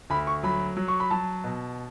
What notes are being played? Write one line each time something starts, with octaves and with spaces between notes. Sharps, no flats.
D2 B5
C#6
F#3 B5
F#3
C#6
B5
F#3 A5
B2